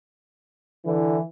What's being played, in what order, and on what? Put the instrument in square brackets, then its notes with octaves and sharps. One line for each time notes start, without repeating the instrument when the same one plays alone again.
[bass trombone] D3 [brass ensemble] E3